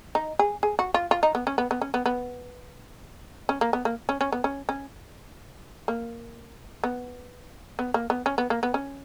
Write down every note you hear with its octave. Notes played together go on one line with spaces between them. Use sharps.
D#4
G#4
G#4
F#4
F4
F4
D#4
B3
C#4
B3
B3
C#4
B3
B3
C#4
A#3
B3
A#3
C#4
C#4
B3
C#4
C#4
A#3
B3
B3
A#3
B3
C#4
B3
A#3
B3
C#4